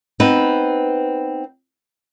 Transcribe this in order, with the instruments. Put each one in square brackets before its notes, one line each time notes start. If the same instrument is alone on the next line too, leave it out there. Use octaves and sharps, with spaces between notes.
[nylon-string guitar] B3 C4 D#4 B4